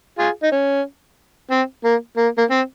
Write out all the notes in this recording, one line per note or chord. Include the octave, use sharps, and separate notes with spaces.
F4 G#4
D#4
C#4
C4
A#3
A#3
A#3
C4